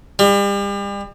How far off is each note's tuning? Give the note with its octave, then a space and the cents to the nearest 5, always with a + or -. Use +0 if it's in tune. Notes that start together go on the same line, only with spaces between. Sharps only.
G3 +35